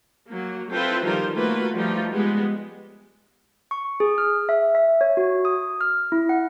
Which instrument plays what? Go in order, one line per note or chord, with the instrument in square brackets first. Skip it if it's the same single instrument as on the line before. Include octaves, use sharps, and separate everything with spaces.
[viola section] F#3 A#3
C4 E4 F4 A4 B4 C5
D#3 F3 G3 F4 A#4 C5
A3 A#3 F4 F#4 B4
F3 G3 A3 D#4 F4
G3 G#3 B3
[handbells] C#6
G#4
F6
E5
E5
C#5
F#4
D#6
F6
E4
F#5